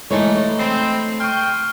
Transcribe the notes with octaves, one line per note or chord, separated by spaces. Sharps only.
E3 G#3 A3 D#4 C#5
C4 D#5 B5 C7
G5 C6 C#6 F6